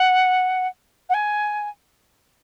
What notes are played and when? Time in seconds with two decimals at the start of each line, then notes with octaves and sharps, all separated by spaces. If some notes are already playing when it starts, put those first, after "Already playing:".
Already playing: F#5
1.09 F#5
1.14 G#5